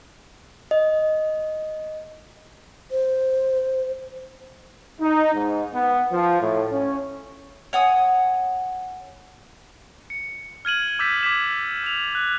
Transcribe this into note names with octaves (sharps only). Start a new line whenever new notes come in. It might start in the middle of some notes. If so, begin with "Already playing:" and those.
D#5
C5
D#4
G#2
B3
F3
A2
C#4
C#5 F#5 G#5 D#6
C#7
F6 G#6 D#7 F#7
D6 E6 G6 A6 B6 E7
D6 G#6 B6 E7
E6 F7
F#6